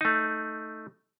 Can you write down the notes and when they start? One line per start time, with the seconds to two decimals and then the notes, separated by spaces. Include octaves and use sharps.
0.01 A3 D#4